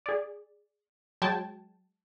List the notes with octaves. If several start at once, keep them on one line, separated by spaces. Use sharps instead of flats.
G#4 D5
F#3 G#3 G5 A5 G#6